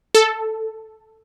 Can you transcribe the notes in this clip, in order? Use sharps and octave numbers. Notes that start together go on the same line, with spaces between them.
A4